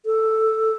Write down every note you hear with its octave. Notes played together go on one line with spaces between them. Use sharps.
A4